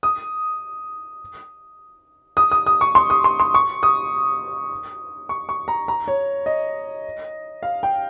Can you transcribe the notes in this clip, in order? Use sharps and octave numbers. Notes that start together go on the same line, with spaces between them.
D#6
D#6
D#6
D#6
C#6
C6
D#6
C6
C6
C#6
D#6
C#6
C#6
A#5
A#5
C#5
D#5
F5
G5